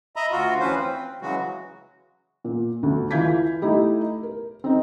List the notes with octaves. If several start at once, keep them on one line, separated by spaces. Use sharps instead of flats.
D#5 E5 A#5 B5
D2 F4 F#4
E3 F3 C#4 B4 C5
C4
C#3 E3 F#3 G#3 F#4
A#2
D2
E3 F4 F5 G6 G#6 B6
A3 D#4 E4 G4
A#4
C4 D#4